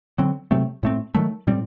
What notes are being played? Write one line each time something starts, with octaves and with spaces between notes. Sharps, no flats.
D3 F#3 C4
C3 F#3 A3 C4
A2 A3 C4
D#3 F#3 A3
A2 G3 C4